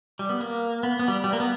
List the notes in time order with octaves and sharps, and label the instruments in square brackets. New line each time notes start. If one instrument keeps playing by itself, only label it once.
[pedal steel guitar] G3
B3
A#3
B3
B3
G3
G3
A#3
B3